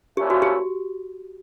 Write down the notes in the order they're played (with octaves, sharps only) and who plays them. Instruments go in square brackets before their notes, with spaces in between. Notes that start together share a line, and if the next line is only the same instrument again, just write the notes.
[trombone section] A#2 F3 A3 C#4 E4 [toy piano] G4
[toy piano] F#4
G4